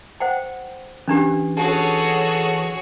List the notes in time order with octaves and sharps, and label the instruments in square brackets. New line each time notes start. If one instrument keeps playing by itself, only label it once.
[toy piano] C5 F#5 G5
[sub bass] E3 [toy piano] C#4 D4 G4
[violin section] F#4 G#4 C#5 [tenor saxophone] A4 [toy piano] G#5